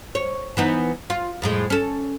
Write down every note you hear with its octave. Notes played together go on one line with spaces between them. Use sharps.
C#5
E3 B3 D#4
F4
F2 A2 G#3
C#4 A4